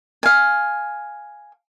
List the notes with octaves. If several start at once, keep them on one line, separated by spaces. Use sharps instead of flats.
F5 G#5